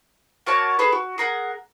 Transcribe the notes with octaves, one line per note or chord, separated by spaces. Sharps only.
A#3 F#4 C#5 A5
G#4 A4 B4
F#4
G#4 A#4 F#5